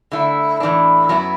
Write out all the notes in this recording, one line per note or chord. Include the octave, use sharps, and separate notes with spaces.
D3 A3 E4
A2 E3 D4
F#2 F#3 B3 E4